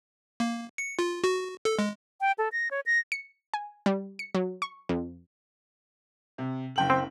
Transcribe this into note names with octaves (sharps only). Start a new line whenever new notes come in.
A#3
C#7
F4
F#4
A4
G#3
G5
A4
A#6
C#5
A#6
C#7
G#5
G3
C#7
F#3
C#6
F2
C3
F#1 G5 F#7
C4